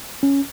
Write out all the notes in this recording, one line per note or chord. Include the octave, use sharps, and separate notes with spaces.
C#4